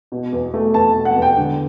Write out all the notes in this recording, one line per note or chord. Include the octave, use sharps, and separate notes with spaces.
B2
E2
A3
E2 A5
B2
F#5
E2
G5
D3